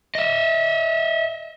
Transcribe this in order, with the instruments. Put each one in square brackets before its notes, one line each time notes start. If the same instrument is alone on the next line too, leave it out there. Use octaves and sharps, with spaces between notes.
[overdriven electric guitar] D#5 E5